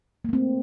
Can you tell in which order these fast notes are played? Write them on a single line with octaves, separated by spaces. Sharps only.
A#3 A3 C4